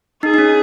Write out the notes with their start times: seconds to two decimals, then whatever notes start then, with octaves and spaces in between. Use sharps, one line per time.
0.23 D#4 G#4
0.34 D#4
0.38 C#4